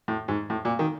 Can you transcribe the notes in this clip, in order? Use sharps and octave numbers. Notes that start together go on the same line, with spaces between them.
A2
G#2
A2
A#2
D#3